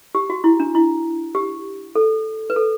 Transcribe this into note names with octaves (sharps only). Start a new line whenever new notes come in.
G4
F#4
E4
D4
E4
G4
A4
B4
A4